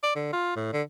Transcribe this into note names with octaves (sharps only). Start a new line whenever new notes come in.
D5
D3
F4
A2
D3